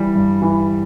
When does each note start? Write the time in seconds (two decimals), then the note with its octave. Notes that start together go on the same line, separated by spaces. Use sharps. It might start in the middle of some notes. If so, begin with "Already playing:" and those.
Already playing: E3 G3
0.15 G2
0.42 E3